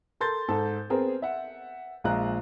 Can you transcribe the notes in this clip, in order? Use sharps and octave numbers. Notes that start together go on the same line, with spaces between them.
A4 A#4 C6 G6 A6
G#2 A4
B3 C4 G#4 A#4
E5 F#5
A#1 G#3 F5 A#5 F#6